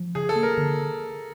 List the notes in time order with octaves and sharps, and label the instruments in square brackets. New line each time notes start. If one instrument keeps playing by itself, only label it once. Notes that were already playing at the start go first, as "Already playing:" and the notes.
Already playing: [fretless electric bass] F3
[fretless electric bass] C#3 [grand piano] G#4
[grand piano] A4
[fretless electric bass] A#3
[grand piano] A#4
[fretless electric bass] D3